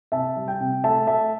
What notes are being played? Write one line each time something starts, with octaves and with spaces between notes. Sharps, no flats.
C3 E5 A5
G3
G5
C3
A3 E5 A5
A3 E5 A5